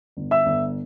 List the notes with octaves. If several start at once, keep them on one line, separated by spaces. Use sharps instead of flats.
G1
E5 E6
G1